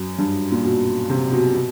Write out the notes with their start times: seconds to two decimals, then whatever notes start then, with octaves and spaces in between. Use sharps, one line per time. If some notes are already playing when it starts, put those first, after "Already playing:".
Already playing: F#2
0.18 G2
0.52 A#2
0.64 B2
1.10 C3
1.32 B2
1.54 B2